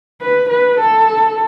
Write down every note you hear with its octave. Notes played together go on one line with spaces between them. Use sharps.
B4
B4
A4